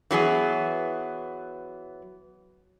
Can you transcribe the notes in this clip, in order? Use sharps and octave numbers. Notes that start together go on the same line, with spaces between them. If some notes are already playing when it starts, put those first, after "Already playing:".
E3 F#3 B3 G#4